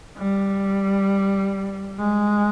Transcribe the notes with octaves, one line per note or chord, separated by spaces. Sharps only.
G3
G#3